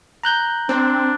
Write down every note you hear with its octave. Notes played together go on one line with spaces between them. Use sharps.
A#5 F#6 G6
C4 D4